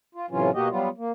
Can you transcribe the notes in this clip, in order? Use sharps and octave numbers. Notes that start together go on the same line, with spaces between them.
F4
A2 C3 E3 F#3 C#4 F4
B2 A#3 F#4 G4 D#5
F#3 G3 B3 F4
A#3